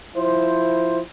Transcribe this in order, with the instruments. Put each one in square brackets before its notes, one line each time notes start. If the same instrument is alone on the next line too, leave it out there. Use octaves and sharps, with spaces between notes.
[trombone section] F3 E4 C5